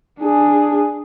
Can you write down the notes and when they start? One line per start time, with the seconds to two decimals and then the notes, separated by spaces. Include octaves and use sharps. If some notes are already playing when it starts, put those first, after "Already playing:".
0.20 D4 G#4